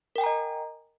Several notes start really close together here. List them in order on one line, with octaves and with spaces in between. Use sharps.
A#4 G5 G#5 A#5 D#5